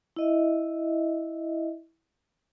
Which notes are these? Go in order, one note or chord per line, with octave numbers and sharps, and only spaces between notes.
E4 D#5 E5